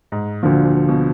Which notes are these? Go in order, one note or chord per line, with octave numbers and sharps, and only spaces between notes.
G#2
D2 A#2 D3 F3
B2